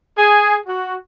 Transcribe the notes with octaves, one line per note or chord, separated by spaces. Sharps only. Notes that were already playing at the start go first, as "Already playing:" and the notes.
G#4
F#4